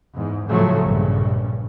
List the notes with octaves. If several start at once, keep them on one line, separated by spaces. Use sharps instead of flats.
E2 G#2
A2 C#3 F3 F#3 A3
A#1 G2 C#3